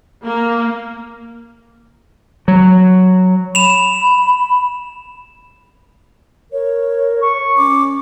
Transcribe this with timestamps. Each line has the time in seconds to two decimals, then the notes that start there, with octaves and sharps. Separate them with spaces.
0.24 A#3
2.48 F#3
3.55 B5 E7 F7
6.52 A#4 C#5
7.22 C#6
7.57 C#4 D6